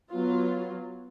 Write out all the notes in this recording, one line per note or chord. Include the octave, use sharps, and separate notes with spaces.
F#3 B3 F4